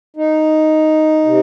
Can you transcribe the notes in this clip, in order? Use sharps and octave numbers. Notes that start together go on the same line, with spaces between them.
D#4
C3